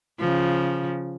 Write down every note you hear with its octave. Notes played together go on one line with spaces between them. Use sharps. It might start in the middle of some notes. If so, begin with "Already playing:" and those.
C#3 F3